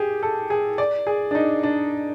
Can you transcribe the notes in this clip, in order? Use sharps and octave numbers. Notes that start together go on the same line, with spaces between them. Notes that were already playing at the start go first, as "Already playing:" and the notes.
Already playing: G4 G#4
A4
G#4
D5
G#4
D4
D#4
D4